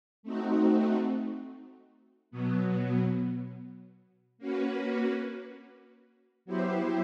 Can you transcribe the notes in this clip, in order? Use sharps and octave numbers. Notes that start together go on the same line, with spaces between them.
A3 C4 D#4 F#4
B2 F#3 B3
A#3 C#4 F#4 B4
F#3 B3 E4 G4 C5